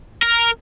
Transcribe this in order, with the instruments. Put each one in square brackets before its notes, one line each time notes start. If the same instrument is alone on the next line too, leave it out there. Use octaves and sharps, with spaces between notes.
[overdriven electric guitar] A#4